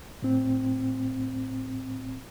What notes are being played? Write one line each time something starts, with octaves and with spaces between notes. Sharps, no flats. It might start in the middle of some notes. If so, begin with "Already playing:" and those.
A2 C4